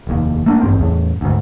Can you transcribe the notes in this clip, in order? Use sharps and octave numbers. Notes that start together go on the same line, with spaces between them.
F1 D#2
A3 A#3 D4
A1 G2 C4
E2 A2
D2 G#2